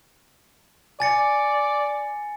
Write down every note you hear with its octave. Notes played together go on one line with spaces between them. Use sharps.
D5 G#5 A6 C#7